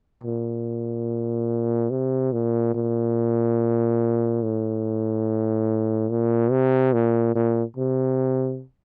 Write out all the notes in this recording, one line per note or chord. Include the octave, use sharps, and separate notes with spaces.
A#2
C3
A#2
A#2
A2
A#2
C3
A#2
A#2
C3